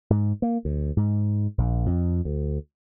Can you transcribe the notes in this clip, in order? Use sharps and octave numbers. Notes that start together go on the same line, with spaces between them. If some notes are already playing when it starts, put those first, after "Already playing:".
G#2
A#3
D2
G#2
A#1
F2
D2